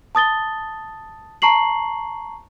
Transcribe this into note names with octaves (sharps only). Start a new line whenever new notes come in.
A5 D#6 A6 G7
A5 A#5 C#6 C7 F#7